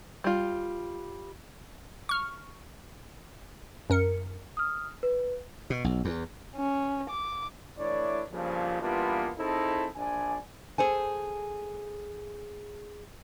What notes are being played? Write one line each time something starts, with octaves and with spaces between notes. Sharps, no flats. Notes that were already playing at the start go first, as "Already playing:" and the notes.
G3 F4
C#6 F6
F#2 A#4 C#7
D#6 F6
B4
B2
B1
E2
C#4
D6
E3 A3 D4 E4 C#5 D5
G2 A#2 C#3 F3
E3 G3 A#3 B3 D4 F4
C4 D#4 E4 G#4 A4
A#1 D4 D5 G#5
G#4 A4 C5 G#5